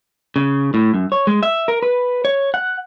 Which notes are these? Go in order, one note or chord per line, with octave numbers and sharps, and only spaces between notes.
C#3
A2
F#2
C#5
G#3
E5
A#4
B4
C#5
F#5